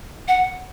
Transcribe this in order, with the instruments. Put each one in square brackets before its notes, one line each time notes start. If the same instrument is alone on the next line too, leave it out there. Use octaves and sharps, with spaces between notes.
[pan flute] F#5